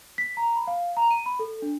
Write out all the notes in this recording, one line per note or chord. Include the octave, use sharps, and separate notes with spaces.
B6
A#5
B5
F5
A#5
D#7
B5
A4
D4